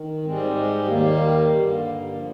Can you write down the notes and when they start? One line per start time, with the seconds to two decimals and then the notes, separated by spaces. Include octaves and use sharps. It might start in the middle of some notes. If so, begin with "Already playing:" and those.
Already playing: D#3
0.25 G#2 G3 G#3 C4
0.56 G#3
0.88 D#2 D#3 G3 A#3
1.49 G2 D3 G3
2.12 D3 F3